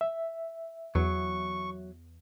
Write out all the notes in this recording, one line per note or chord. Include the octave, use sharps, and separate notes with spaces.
E5
E2 F#3 C#6